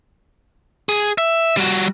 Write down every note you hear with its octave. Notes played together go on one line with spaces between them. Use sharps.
G#4
E5
G3 F#4